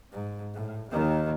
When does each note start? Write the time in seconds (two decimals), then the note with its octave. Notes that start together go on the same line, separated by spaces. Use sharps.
0.12 G#2
0.54 A2
0.90 D#2 D#3